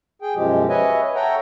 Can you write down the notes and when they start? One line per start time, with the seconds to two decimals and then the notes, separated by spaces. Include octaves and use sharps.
0.22 G#4 G5
0.35 F#2 B2 F3 G#3 G4
0.69 B4 C#5 D#5 E5 G#5
1.15 A4 C#5 E5 F#5 G5 A#5